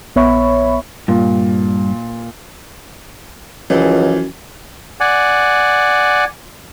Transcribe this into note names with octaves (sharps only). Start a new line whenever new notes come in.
A#1 B3 C#5 E5 B5 C#6
G2 A#2
C#2 F#2 E3 F3
D5 F#5 G#5